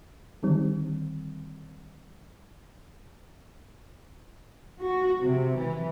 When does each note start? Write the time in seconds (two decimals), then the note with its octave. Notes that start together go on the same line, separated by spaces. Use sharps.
0.43 D3 D#3 G3 C4
4.80 F#4
5.24 C3
5.58 E3